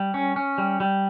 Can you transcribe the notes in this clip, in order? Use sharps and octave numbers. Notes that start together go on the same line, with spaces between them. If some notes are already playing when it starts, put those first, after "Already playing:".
Already playing: G3
C#4
C#4
G3
G3